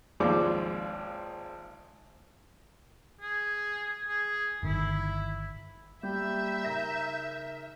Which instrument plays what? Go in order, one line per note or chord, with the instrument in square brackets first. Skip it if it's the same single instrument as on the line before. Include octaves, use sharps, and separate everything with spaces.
[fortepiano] G#1 D#2 F3 G#3 D5 D6
[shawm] G#4
G#4
[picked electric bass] G1 D#3 [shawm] E4
[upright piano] G3 [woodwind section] A#3 B5 [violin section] E5 [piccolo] G6
[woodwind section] C#3 D#4 A#4 [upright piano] A#5 A#6